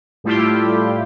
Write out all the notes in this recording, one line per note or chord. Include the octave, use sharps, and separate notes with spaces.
A2 G3 A3 E4 F4 G4